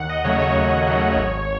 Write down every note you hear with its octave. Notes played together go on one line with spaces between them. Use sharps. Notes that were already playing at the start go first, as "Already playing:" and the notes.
Already playing: D#2 F#5
D#5
C#3 F#3 A3 C#5
C#5
D#2
C#3 F#3 A3
G#1